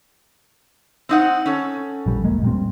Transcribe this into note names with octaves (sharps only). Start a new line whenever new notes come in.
C4 D#4 F#5
C#4 A4
A#1 G3
E1 G#3 A#3
A#2 G3 C4